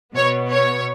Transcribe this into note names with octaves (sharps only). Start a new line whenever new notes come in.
B2 B3 C#5
C#5